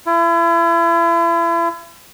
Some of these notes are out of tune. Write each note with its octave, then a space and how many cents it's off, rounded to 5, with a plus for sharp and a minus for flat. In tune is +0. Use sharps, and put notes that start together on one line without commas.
E4 +40